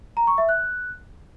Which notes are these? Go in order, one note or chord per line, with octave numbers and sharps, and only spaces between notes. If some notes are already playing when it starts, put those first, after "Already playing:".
A#5
C#6
E5
F#6